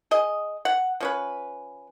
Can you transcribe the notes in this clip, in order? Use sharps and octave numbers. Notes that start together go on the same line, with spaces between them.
G#4 D#5
F#5
F3 C#4 B4